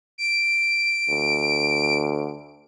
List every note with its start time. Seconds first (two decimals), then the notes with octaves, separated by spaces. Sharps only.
0.18 D7
1.10 D2